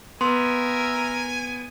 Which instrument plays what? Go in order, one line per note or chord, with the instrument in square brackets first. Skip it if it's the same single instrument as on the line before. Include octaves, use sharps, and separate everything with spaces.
[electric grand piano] B3 [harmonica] A#4 E5 [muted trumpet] G#5 [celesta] C6